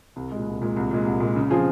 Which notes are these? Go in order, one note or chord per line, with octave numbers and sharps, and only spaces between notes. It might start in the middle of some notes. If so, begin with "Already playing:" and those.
C2
A#2 G#3
C2
A#2 G#3
C2
A#2 G#3
C2
A#2 G#3
C#3
F3 C4 F4 G#4